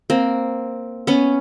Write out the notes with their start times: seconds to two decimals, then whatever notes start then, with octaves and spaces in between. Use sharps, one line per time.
0.10 A#3 C4
1.07 B3 C#4